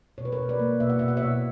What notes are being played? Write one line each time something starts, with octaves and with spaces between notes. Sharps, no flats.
B2 C#5
B4
A#4 C#5
B2
B4 D5
A#3
B2 E5
F#5
B2 E5
F#5
C#5 E5
B2